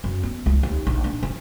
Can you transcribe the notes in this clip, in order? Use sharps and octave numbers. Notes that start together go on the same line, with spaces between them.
F#2
B3
C#2
D#2
A#1
D4
F3